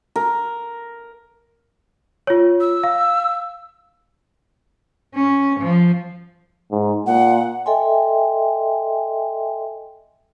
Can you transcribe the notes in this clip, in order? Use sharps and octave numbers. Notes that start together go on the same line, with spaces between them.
A#4
F4 C#5
E6
F5
C#4
F3
G#2
A#2 F#5
A4 D#5 E5 G5 G#5 C6